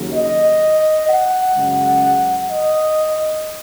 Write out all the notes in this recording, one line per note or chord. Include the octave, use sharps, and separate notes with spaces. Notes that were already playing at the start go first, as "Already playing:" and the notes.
Already playing: D#2 C#3 F#3
D#5
F#5
F#2 C#3 G#3
D#5